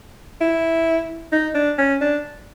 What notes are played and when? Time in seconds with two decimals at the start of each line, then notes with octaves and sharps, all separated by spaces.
0.41 E4
1.32 D#4
1.55 D4
1.78 C#4
2.01 D4